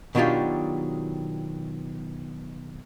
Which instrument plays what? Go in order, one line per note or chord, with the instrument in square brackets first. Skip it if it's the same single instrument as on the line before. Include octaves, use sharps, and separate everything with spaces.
[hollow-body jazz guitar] B2 D#3 F#3 D4 F4 G4